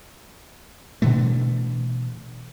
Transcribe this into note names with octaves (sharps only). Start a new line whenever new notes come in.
B2 D3 E3 A3